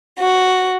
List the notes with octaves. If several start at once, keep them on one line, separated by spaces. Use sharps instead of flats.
F#4